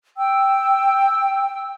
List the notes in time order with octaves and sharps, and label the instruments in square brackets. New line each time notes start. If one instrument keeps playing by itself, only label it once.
[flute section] G5 E6